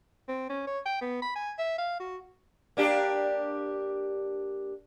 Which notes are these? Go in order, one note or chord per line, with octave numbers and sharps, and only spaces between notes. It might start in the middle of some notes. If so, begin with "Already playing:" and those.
C4
C#4
C#5
G5
B3
B5
G#5
E5
F5
F#4
A#3 D4 G4